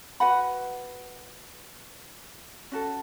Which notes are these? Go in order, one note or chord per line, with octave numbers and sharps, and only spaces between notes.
F#4 B4 F#5 B5
C#4 F#4 A4